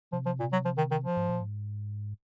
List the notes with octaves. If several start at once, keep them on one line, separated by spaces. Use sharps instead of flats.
C3 F3
F3
A#2
F#3
F3
D#3
D#3
F3
G#2
A#2
G#2